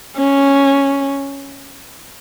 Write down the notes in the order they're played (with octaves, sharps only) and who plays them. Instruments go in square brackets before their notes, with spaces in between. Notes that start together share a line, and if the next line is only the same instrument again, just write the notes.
[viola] C#4